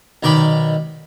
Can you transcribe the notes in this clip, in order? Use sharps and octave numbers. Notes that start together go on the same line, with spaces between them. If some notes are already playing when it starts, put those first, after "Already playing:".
B1 D#3 D5 G5 B5